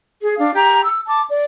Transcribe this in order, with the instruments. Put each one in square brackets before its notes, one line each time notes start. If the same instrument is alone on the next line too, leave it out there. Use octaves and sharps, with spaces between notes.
[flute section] G#4
D4 F5
G4 A#5
E6
A5 D6
D5